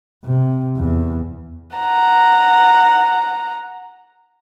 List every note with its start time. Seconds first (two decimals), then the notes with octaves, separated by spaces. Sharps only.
0.24 C3
0.77 E2
1.77 F#5 A#5